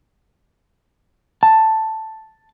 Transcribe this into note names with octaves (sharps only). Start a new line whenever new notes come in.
A5